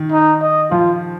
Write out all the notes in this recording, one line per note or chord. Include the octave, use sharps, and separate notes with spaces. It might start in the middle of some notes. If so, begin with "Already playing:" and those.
Already playing: D#3
D#4
D#5
F3 F4